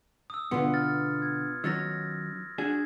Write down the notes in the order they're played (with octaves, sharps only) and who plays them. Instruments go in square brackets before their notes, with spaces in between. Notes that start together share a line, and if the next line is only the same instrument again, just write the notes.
[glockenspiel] D#6 E6
[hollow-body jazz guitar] B2 D3 [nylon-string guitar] B3 F4 [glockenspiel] C6 C#7
[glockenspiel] F6 A6
G#6
[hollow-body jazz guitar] D#3 F#3 C#4 [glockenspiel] E6 A6 A#6
[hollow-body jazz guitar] D4 F#4 G#4 [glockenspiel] G#6